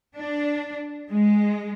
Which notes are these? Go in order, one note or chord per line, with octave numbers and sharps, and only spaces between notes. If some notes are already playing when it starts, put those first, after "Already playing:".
D4
G#3